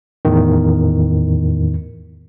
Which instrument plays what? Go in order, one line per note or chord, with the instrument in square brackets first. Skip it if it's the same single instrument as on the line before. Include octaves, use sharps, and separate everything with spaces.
[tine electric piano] E2 A2 D#3